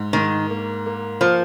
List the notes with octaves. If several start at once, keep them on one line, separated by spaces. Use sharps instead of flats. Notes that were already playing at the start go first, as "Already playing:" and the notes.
Already playing: G#2
G#2 D#3
A#3
A#3
F3 A#3